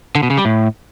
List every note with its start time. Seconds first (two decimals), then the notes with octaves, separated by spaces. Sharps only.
0.15 D3
0.23 B2
0.30 C#3
0.38 G3
0.45 A2